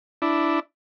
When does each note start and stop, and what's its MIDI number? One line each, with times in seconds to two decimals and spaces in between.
0.22 0.60 62
0.22 0.60 64